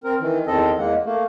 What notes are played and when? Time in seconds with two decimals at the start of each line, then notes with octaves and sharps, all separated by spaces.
0.04 C4 A#4
0.20 D#3 E3
0.47 E2 D#3 C4 A4 D#5
0.78 E2 G#3 A#3 F#5
1.05 A3 A#3